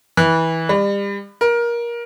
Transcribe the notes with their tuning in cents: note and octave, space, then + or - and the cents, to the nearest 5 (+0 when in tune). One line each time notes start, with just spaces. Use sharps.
E3 -20
G3 +35
A#4 +20